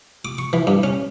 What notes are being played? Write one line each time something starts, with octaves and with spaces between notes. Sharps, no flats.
D6
C#6
E3
G2
C#4